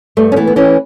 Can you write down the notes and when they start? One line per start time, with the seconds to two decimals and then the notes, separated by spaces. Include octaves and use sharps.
0.17 G2 A3
0.32 C#4
0.36 E3 B3
0.47 B3
0.56 E3 C#4